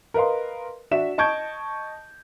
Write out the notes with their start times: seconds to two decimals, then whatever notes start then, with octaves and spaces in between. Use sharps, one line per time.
0.14 A#4 B4 D#5 F5 C6
0.91 D4 F#4 E5 E7
1.18 D#5 A5 C#6 G6 G#6 D7